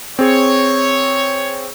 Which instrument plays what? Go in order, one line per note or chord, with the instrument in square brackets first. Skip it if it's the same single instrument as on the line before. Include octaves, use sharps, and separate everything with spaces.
[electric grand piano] C4 G#4 [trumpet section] C#5